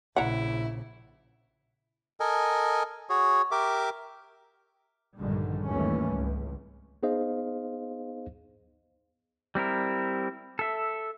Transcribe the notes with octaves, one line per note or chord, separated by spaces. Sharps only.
A#1 C#3 E4 F#5 A#5
A4 A#4 D#5 G#5
F#4 G#4 C#5
G4 A#4 E5 D6
A#1 G2 D3 D#3 G3 G#3
G#1 D#2 E3 G3 A3 C#4
C#2
B3 D#4 G#4 C5 D#5 F5
G3 C4 E4 A#4
A4 E5